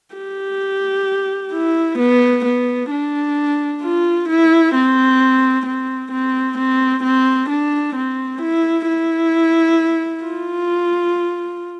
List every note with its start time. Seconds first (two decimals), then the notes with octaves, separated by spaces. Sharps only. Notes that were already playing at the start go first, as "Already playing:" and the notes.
0.15 G4
1.53 E4
1.99 B3
2.45 B3
2.91 D4
3.82 F4
4.29 E4
4.74 C4
5.66 C4
6.12 C4
6.58 C4
7.04 C4
7.49 D4
7.95 C4
8.42 E4
8.87 E4
10.25 F4